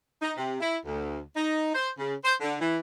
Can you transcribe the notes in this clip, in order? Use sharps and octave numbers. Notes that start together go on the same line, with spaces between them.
D#4
C3
E4
D2
D#4
C5
C#3
C5
D3
E3